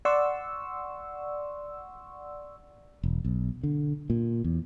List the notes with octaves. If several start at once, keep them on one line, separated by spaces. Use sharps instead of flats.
D5 F#5 C6 C#6 E6
E1
B1
D3
A#2
E2